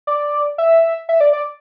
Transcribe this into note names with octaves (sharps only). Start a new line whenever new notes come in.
D5
E5
E5
D5
D5